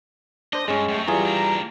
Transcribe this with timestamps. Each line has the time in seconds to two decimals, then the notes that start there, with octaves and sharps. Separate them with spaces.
0.53 D4 C5 D#5
0.68 G2 G#3 C#4
0.89 F#2 A3 G5
1.08 E3 G3 F4 G#4 A#5
1.26 A#3 D4